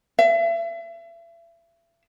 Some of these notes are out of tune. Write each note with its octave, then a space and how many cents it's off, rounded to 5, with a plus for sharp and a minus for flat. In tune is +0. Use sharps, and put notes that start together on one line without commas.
E5 +35